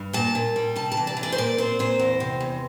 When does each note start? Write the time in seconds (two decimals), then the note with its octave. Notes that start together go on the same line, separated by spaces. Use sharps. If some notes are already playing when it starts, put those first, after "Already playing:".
Already playing: G2
0.13 A#2 A5
0.35 A#2
0.56 G3
0.76 C3 A5
0.92 A5
0.97 E3
1.07 D5
1.17 E3
1.23 D5
1.32 C5
1.38 A#2 D5
1.58 C4 C5
1.79 A#2 C5
2.00 E2
2.20 C3
2.41 E2